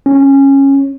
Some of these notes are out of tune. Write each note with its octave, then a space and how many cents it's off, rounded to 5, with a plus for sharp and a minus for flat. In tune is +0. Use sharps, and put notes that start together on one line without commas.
C#4 -15